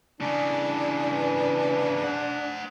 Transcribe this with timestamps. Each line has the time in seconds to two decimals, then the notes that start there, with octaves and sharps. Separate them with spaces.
0.21 C#3 E3 D4
1.12 B4
2.04 C5 F#5